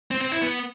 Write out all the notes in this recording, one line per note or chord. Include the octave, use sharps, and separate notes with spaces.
C4
C4
E4
B3